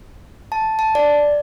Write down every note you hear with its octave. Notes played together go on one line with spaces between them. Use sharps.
A5
A5
D5